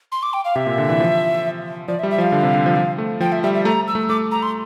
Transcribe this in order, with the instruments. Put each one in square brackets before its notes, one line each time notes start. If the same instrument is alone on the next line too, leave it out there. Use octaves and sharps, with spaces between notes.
[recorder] C6
D6
G5
F5
[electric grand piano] C3 [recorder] E5
[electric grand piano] A#2
D3
E3
F3
[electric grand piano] F3 [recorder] D5
[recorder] E5
[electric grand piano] G3
[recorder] E5
[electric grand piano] F3
[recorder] F5
[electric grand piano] D3
C3
D3
F3
F3
A3
[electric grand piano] F3 [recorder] G5
[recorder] E5
[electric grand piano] G3 [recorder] E5
[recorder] E5
[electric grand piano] A3 [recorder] A#5
[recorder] E6
[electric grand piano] A3
[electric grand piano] A3 [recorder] D6
[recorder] A#5
C6